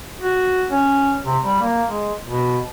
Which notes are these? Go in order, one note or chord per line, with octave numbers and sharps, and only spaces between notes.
F#4
C#4
C3
G3
A#3
G#3
B2